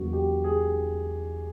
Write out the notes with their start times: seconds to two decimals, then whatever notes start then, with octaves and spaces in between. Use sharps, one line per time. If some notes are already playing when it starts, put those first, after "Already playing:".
Already playing: E2 C#3 F#3 A#3 F#4
0.13 G4
0.44 G#4